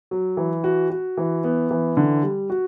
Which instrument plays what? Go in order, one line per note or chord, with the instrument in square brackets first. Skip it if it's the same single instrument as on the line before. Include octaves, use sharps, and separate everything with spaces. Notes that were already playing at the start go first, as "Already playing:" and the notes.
[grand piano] F#3
E3
F#4
F#4
E3
B3
E3
D3
G3
F#4